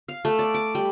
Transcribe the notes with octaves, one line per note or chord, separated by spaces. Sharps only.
F5
A3
D5
D6
G3